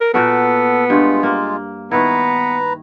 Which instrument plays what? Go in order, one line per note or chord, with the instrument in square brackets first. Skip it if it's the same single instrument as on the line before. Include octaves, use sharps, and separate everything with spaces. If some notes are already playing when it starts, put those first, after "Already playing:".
[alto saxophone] A#4
[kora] A#2 F#4 A#4 [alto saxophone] B3 [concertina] A4
[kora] G2 A3 [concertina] G#3 F4
[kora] A#3
[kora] D#3 E4 [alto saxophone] B3 [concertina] B4 A#5